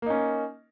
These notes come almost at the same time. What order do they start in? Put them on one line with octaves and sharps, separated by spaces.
A#3 D#4 C#4